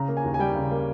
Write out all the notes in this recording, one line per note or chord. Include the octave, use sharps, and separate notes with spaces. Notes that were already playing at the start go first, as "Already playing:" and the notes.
Already playing: C#3 A#5
A#3
G#5
D#2
G#5
G3 G5
C#3
A#3